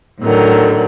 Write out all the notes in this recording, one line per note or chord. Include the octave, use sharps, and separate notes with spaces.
A2 D3 D#3 F#3